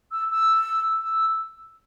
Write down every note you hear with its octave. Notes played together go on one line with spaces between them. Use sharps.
E6
E6
E6